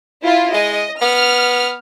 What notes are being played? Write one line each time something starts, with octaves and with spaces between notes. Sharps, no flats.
E4 F4
G#3 D#5
B3 F6